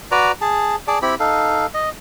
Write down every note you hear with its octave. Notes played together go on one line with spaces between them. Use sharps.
F#4 B4 D5 A#5
G#4 A5
G#4 D5 A5
C4 E4 G4 B5
D#4 A4 F5
D#5